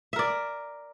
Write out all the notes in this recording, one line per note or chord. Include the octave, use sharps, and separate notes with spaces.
A#4 D5 E5